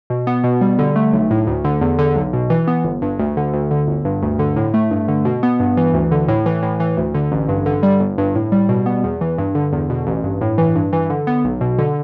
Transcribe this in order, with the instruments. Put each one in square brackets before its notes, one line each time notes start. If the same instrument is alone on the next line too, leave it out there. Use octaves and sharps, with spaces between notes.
[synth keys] B2
B3
B2
G3
D3
A3
B1
A2
D2
D3
E2
D3
B1
B2
E3
B3
G1
G2
D2
D3
D2
D3
G1
G2
D2
D3
A2
A3
G2
D3
B2
B3
G2
E3
D2
D3
A2
E3
A2
E3
D2
D3
A1
G2
D3
G3
G1
G2
A2
G3
B2
B3
E2
E3
G2
D3
E2
B2
A1
G2
A2
E3
G2
E3
D3
B3
B1
B2
D3